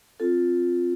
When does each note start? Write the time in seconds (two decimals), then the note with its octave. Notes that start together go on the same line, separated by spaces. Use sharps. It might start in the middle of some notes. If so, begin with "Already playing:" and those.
0.20 C4 F4 A4